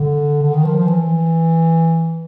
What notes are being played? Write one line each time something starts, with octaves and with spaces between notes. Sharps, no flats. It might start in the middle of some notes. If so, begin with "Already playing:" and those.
Already playing: D3
D3
D#3
F3
F3
E3